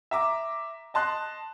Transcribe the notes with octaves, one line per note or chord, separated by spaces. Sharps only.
E5 A#5 D6
D#5 A5 C6 F#6